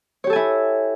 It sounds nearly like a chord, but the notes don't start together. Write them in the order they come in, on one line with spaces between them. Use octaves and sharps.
C#5 G4 A4 G#5 E4